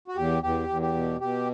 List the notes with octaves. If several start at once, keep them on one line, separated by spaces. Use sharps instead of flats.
F#4
E2 G4
E2 G4
E2
G4
B2
B2 G4